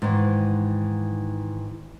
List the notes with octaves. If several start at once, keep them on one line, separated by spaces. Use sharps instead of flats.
G#2 D#3 E3